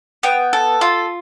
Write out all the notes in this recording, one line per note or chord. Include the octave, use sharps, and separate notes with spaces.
B3 G5
A4
F4